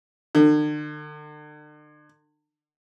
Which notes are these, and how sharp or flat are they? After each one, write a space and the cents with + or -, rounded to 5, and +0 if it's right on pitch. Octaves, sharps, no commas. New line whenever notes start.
D3 +40